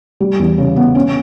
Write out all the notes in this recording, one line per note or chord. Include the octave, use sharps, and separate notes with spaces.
G3
E2
C#3
B3
C#4